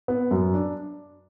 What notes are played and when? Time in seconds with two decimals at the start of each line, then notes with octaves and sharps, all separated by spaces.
0.08 B3
0.31 F#2
0.54 D4